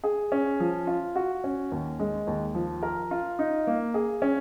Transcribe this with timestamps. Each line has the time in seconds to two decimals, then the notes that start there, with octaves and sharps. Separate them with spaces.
0.04 G#4
0.32 C#4
0.60 F3
0.87 F4
1.16 F#4
1.44 C#4
1.72 D#2
1.99 G#3
2.27 D#2
2.55 F3
2.83 A#4
3.11 F4
3.39 D#4
3.67 A#3
3.94 G#4
4.22 C#4